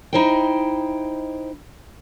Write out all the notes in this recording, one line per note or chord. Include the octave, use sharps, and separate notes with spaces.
D#4 E4 C5 D#5 G5